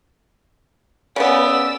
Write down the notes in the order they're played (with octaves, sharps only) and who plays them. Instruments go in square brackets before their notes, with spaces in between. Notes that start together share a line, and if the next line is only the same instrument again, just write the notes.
[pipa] C#3 B3 [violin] D5 E6